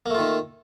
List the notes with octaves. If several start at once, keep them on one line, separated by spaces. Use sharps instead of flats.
D#3 A3 A#3 F4